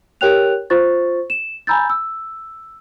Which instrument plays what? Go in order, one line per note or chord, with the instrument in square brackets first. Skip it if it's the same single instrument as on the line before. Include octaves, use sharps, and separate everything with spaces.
[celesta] G4 A#4 C#5 G5 F#6 F7
F4 C5 C#6 A6
E7
G#5 A#5 B5 E6 G6 A6
E6